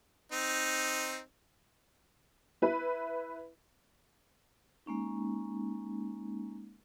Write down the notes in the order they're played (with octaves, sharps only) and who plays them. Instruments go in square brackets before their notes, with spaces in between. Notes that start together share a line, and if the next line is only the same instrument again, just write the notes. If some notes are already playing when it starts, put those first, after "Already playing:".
[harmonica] C4 D#4
[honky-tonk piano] E4 B4
[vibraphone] G#3 A#3 C#4 D#4